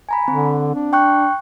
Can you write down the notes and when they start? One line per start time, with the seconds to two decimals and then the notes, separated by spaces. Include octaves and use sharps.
0.09 G#5 A#5 B5
0.28 D3 C4
0.74 D4
0.93 G5 C#6 F#6